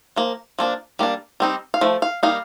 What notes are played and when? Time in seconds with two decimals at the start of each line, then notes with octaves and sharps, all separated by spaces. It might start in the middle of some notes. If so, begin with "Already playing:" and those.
0.16 F3 A#3
0.59 F3 A#3 D4
0.99 G3 A#3 D4
1.40 G3 C4 D#4
1.74 F5
1.81 F3 A3
2.02 F5
2.23 G3 A#3 D#4 F5